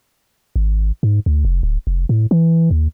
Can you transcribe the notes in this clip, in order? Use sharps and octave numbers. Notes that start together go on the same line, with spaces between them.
G#1
G#2
D2
F1
D1
F1
A2
E3
D#2